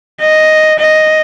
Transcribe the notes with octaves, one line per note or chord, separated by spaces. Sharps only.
D#5
D#5